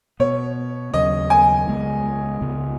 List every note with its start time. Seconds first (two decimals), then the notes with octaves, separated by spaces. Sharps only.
0.20 B2 B3 C#5
0.94 D#2 C#3 F#3 C#4 D#5
1.30 G#5
1.67 C#2 C#3 G#3 B3
2.41 C#2 C#3 B3